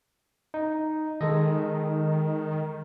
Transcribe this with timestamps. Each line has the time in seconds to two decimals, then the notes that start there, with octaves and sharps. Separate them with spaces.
0.54 D#4
1.21 D#3 G#3 A4 D#5